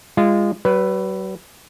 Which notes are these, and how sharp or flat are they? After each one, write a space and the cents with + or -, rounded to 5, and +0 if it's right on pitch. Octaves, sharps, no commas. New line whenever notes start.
G#3 -30 F4 -25
F#3 +45 B4 +0